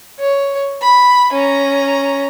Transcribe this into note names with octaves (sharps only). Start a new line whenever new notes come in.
C#5
B5
C#4 A#5